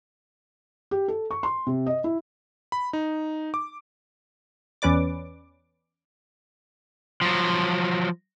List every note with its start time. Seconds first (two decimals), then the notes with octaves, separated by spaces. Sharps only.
0.91 G4
1.08 A4
1.31 C#6
1.43 C6
1.67 C3
1.86 D#5
2.04 E4
2.72 B5
2.93 D#4
3.54 D6
4.82 E2 C#4 B4 D5 D6
7.22 F3 F#3